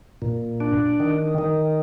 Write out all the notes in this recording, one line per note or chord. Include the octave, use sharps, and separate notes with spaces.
A#2
D4
D#3
D#3